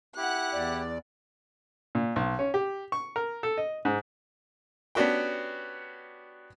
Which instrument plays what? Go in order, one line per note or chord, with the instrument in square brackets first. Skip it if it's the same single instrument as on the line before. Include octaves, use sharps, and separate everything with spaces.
[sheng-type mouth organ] E4 G4 [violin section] F#5 F#6
[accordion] E2 D5
[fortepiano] A#2
B1
C#4
G4
C#6
A#4
A4
D#5
G#2
B3 C#4 D4 F#4 G4 G5